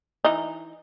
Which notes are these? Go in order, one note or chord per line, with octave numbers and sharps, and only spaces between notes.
E3 D#4